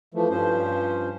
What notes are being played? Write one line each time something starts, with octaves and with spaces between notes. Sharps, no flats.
E3 F3 A3
G2 F3 C#4 C5